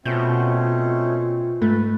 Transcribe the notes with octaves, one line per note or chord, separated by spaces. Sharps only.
B2 A3 C4 C#4 F4 G6
G#2 A3 B4